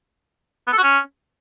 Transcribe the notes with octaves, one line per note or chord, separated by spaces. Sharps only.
B3
A4
F#4
C#4